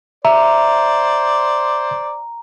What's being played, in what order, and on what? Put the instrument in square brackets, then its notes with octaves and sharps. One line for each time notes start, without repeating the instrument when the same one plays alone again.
[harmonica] C5 D5 [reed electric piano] E5 [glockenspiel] A#5